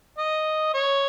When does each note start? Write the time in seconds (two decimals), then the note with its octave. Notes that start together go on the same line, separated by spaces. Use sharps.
0.18 D#5
0.74 C#5